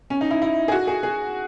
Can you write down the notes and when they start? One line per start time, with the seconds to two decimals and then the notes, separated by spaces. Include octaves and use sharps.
0.10 C#4
0.21 D#4
0.31 E4
0.42 E4
0.68 G#4
0.72 F#4
0.87 G#4
1.03 G#4